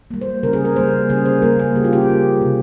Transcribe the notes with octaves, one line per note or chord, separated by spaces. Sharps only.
G3 A#3
C5
C#3 A#4
G#4
A#4
G3 A#3 C5
C#3 G#4
C5
G3 A#3 A#4
G#4
C#3 G4
F4
G4
G3 A#3
C3